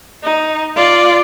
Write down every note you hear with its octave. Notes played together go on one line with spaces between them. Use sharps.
D#4
F4 D5